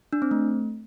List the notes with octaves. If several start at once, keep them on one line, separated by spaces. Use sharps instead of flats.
D4
C4
A3